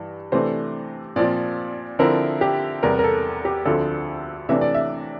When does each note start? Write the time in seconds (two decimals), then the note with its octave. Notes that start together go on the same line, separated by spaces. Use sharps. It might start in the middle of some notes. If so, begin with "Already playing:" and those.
Already playing: G2 E3
0.32 C3 E3 A3 D4 C5
1.16 A#2 F3 C4 F4 D5
1.99 D3 F3 C4 E4 A#4
2.41 G4
2.83 E2 C3 G3 A#4
2.99 A#4
3.04 A4
3.45 G4
3.65 D2 D3 F3 C4 A4
4.49 C3 E3 A3 D4 E5
4.61 D5
4.75 E5